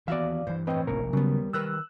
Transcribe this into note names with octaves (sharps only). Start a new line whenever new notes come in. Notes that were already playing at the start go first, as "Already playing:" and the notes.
D#2 E3 B3 F#4 D5 E5 F5
G2 E3 C5
A2 C4 B4 D#5 G5
F1 A#1 B2 A#4
D#2 C#3 F#3 G3 B3
D#3 A#4 B4 E6 F#6